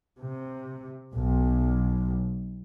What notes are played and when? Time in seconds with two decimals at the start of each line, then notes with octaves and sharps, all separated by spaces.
0.18 C3
1.14 B1